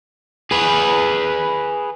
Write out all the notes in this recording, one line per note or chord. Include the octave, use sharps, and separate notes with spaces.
G#4 B4